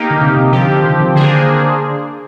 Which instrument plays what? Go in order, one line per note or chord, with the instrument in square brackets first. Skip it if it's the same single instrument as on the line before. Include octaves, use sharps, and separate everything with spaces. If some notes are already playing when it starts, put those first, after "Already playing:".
Already playing: [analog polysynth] A#3 D#4 G4 A#4
[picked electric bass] D3
C3
C3
[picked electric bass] D3 [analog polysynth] F3 C4 G4
[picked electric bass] D#3
D3
[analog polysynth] A#3 D4 G#4 C5